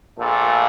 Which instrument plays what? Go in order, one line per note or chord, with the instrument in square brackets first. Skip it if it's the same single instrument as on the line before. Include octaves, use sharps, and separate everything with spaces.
[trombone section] A#1 A#2 A3 A4